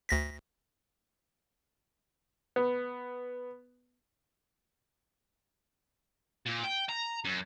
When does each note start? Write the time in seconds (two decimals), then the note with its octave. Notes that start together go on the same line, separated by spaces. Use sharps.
0.09 D2 A#6 B6
2.56 B3
6.46 A#2
6.64 G5
6.89 A#5
7.25 F#2